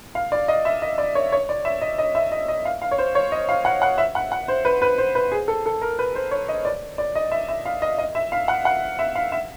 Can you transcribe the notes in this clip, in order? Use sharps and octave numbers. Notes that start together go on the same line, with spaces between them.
F5
D5
D#5
E5
D#5
D5
C#5
C#5
D5
E5
D#5
D#5
E5
D#5
D#5
F5
F5
C#5
C5
C#5
D#5
F5
F#5
F#5
E5
F#5
F#5
C5
B4
B4
C5
B4
G#4
A4
A4
A#4
B4
C5
C#5
D#5
D5
D5
D#5
E5
E5
F5
D#5
D#5
E5
F5
F#5
F#5
E5
F5
E5